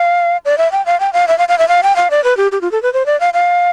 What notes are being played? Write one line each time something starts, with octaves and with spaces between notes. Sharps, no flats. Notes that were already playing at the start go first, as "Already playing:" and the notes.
Already playing: F5
D5
E5
G5
F5
G5
F5
E5
F5
F5
E5
F5
G5
F5
D5
B4
G4
G4
F4
A4
B4
C5
D5
F5
F5